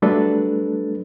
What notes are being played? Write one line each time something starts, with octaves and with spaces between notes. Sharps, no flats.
F#3 G3 A3 D4 A4 B4